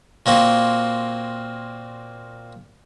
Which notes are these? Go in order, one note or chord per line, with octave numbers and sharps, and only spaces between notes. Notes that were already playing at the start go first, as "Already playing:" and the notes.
A#2 A#3 C4 F#4